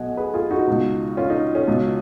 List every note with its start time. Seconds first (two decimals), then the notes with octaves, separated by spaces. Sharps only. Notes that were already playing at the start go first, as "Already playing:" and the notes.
Already playing: B1 B2 D#5 F#5 G#5
0.17 G#4 B4
0.34 F4 G#4
0.50 D#4 F#4
0.67 C#2 B2
1.17 C#4 F4
1.30 D#4
1.55 C#4
1.67 C#2 B2